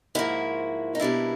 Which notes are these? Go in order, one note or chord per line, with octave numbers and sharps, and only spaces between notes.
G#2 F3 A#3 E4 F#4
D#4
B2 G3 A#3 D4 E4